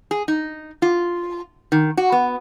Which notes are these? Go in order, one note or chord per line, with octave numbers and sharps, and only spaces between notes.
G#4
D#4
F4
D#3
F#4
B3